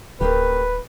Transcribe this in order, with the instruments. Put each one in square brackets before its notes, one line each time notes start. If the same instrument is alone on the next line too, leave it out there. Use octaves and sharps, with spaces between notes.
[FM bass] D1 [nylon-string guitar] C#3 A#3 G4 [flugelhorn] B4